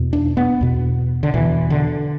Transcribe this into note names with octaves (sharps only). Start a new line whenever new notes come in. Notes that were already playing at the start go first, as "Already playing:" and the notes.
Already playing: E2 B2
D4
B3
E2 B2
D3
E2 B2 E3
D3